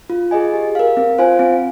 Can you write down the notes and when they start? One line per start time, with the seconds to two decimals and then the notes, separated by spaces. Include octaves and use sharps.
0.10 F4
0.31 G#4 D#5 G#5
0.54 G4
0.75 A#4 F5
0.97 C4
1.18 F4 C5 F5 G#5
1.39 C4